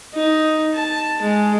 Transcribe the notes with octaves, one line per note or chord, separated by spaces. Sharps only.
D#4
A5
G#3